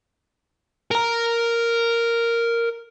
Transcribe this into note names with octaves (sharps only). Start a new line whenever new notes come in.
A#4 A#5